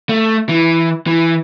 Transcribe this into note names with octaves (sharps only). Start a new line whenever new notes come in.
A3
E3
E3